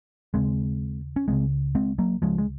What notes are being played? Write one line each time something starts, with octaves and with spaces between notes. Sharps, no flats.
D#2 C#3 G#3 C4
C#4
C#2 C#3 G#3 C4
G#3 C4
F#3 A#3
C#2 C#3 F3 G#3
G#3